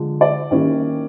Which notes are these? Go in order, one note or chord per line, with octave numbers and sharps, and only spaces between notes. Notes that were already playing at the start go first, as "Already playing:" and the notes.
Already playing: D3 F3 G#3
D5
D#3 G3 A#3 C#4 E4